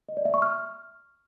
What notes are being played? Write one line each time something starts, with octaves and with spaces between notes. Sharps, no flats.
D#5
D5
E5
C#6
F6